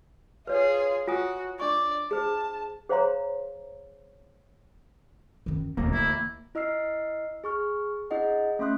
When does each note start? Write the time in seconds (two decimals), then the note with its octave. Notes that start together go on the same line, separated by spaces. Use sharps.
0.47 F4 G#4 B4 C#5
1.08 F4 F#4 G#5 D#6
1.60 D4 D5 C#6
2.11 G#4 C5 A5
2.89 G#4 C5 C#5 F5 A#5 C6
5.46 F#2 D#3
5.77 D#1 D2 A#3 B3
5.93 E3 E4
6.55 E4 D#5 E6 F6 C7
7.44 G#4 C#6 F6
8.11 D4 E4 G#4 D#5 F#5
8.59 A3 C#4 E5 C6 D#6 F#6